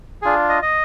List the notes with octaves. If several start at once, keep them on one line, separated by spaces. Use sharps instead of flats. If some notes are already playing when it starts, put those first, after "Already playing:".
D4 F4 G#4
D#5
D#5